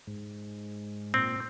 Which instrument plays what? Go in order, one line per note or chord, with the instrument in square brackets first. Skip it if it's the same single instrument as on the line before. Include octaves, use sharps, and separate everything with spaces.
[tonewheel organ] G#2
[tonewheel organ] A#2 [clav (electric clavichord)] C4